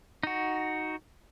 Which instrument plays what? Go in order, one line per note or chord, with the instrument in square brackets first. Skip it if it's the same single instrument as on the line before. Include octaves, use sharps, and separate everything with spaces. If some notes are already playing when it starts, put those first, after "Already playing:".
[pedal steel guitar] D#4 F#4